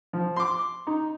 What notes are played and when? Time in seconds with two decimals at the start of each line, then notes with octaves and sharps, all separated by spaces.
0.13 F3
0.36 C6 D6
0.87 D#4